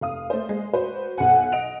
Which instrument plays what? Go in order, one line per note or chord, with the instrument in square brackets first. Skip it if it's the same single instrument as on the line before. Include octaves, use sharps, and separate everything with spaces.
[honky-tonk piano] F1 F5 D#6
A3 C5
G#3
F#4 B4 C5
[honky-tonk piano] B1 G#5 [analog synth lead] F#5
[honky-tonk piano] D#5 D7 F7